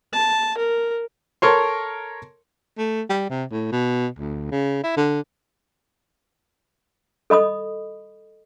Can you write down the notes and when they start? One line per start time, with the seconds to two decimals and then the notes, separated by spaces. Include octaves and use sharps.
0.13 A5
0.58 A#4
1.42 A4 A#4 C#5 C6
2.78 A3
3.09 G3
3.30 C3
3.51 A2
3.72 B2
4.19 D2
4.51 C#3
4.84 E4
4.96 D3
7.30 A4 D#5 B5 D#6